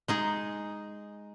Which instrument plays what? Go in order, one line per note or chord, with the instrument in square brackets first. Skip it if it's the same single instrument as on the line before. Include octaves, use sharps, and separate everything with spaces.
[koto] G#3 D#4 G#4